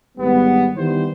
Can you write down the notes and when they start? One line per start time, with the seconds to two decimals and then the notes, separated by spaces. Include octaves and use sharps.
0.18 G#1 G3 B3
0.75 D#3 E3 G3 B3 C5